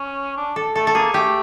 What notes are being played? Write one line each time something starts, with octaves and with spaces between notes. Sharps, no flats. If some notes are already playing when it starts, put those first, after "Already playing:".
Already playing: C#4
D4
A4
A3 A4
A4
A#3 G#4
A3 G4